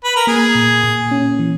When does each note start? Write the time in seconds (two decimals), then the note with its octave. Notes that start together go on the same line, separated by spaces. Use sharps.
0.04 B4
0.16 A#4
0.27 A#3 G#4
0.55 A#2
0.83 A#2
1.11 C#4
1.39 E3